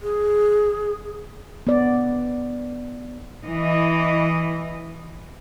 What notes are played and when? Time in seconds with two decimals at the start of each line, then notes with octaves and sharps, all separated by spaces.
0.02 G#4
1.67 B3 D5
3.46 E3 D#5